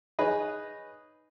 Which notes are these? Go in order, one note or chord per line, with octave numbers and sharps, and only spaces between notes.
D#4 G#4 B4 C#5 D#5